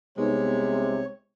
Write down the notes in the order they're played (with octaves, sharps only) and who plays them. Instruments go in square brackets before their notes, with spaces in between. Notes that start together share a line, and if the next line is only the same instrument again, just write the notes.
[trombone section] C2 C3 [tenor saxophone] G#3 [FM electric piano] B3 D#4 [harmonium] C#5